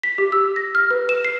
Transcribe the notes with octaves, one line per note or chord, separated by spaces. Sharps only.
B6
G4
E6
A#6
F6
B4
E7
C7